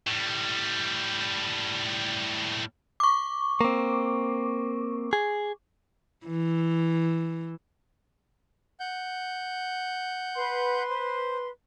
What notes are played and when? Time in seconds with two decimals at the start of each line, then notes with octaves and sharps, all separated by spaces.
0.07 A2 G3
3.00 C#6 D6
3.61 A#3 C4
5.13 G#4
6.26 E3
8.80 F#5 G6
10.34 B4 C6
10.90 C5